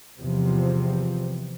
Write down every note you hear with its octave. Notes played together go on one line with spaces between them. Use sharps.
E2 C3 F3